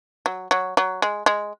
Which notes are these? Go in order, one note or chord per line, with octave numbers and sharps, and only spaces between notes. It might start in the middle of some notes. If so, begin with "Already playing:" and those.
F#3
F#3
F#3
G#3
G#3